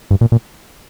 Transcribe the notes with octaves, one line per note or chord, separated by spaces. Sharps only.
G2
A#2
A#2